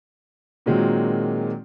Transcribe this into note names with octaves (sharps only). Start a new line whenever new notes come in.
A#2 D#3 F#3 G#3 A#3 C4